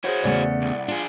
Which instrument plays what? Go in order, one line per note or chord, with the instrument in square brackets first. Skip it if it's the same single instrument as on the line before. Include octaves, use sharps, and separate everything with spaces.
[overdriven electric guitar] E4 F#4 [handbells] G#4 C5 C#5
[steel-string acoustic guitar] E2 C#3 A3 [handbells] D5 F#5
[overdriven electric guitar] C2
[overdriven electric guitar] D4 G#4 [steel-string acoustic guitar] F4